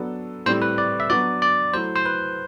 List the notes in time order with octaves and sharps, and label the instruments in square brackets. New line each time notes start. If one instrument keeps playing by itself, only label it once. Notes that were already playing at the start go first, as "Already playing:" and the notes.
Already playing: [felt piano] F#3 B3 D4 A4
[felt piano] A2 G3 C4 E4 [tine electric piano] C5
[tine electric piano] B4
D5
E5
[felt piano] F#3 B3 D4 F#4 B4 [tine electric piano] D5
[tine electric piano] D5
[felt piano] F#3 A3 E4 [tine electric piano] C5
[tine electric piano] C5
B4